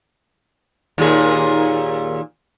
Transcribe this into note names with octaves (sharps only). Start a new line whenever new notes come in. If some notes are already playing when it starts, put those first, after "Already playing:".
D#2 A#2 G#4